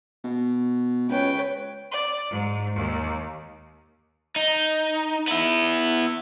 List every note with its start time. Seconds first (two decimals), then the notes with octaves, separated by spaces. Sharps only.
0.24 B2
1.09 C#2 B4 C#5 G5
1.91 D5
2.30 G#2
2.77 D#2
4.36 D#4
5.28 B3 E4